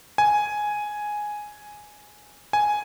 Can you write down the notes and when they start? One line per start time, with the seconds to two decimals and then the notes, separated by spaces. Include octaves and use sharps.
0.18 G#5
2.53 G#5